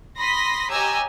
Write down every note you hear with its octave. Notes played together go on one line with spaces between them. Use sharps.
B5 C6 D#6 A#6 B6
G4 C#5 D#5 G#5 A#5 E6